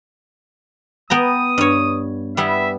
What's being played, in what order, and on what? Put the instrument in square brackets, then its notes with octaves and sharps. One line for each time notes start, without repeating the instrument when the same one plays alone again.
[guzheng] B3 G5 A#5 [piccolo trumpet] D#6
[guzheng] G2 C#5
[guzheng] G3 B3 E4 [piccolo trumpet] E5